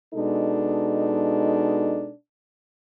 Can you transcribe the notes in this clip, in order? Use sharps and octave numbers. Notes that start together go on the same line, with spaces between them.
B2 G#3 D4 D#4 A4